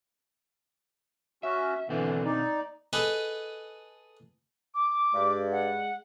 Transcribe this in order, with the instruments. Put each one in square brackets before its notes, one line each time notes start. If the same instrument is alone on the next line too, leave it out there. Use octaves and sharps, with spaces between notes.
[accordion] C#4 F#4 [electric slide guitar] E5
[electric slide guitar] B2 C4 D4 [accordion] D3 E3
[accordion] D#4 D5
[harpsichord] G#4 A4 B4 D#5
[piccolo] D6
[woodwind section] G2 [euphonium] G#3
[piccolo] F#5